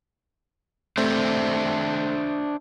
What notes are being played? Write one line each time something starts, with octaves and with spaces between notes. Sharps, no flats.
A3 C4 D4 C5 E5